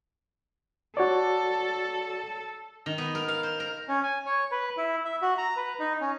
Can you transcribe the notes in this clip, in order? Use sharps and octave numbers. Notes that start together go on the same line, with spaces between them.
F#4 A4 C#5 D5
D#3
B3
A#4
F5
C5
A#4
C#4
G#5
C#5
B4
E4
E5
F#4
A#5
B4
D#4
C#4